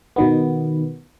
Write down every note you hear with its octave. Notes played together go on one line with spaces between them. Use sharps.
B2 D#3 B3